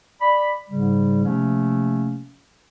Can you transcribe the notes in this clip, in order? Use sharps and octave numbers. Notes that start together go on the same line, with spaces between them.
D5 B5
G#2 C#3 G3
C3 F3 A3 A#3 C#4